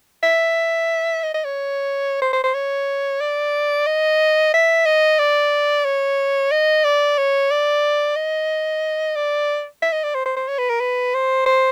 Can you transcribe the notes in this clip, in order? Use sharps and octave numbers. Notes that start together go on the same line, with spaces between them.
E5
D#5
D#5
C#5
C5
C5
C5
C#5
D5
D#5
E5
D#5
D5
C#5
D#5
D5
C#5
D5
D#5
D5
E5
D#5
D5
C5
C5
C5
C#5
B4
A#4
B4
C5
C5